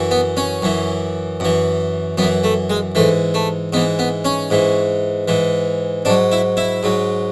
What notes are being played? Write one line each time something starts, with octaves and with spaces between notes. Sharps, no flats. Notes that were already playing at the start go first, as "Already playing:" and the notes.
Already playing: F#2 E3
B3
C#4
F#2 E3
F#2 E3
F#2 E3 B3
A3
G#3
G#2 E3 A3
A3
G#2 E3 B3
B3
C#4
G#2 E3
G#2 E3
G#2 F#3 D4
E4
E4
G#2 F#3